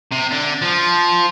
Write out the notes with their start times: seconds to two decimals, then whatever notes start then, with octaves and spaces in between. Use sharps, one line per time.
0.12 C3
0.31 D3
0.62 F3